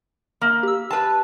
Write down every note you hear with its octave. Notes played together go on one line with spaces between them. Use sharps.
A#3
G4 E6
B4 A5